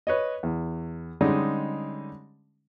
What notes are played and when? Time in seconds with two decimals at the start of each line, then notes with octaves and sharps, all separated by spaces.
0.07 B4 C#5 D#5
0.43 E2
1.21 D3 G3 G#3 C#4 D#4